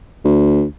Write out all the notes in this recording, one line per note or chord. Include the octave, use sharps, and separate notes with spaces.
D2